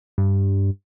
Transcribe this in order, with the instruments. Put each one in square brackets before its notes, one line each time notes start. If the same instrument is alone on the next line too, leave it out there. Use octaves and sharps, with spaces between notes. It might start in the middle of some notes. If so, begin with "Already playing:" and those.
[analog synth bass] G2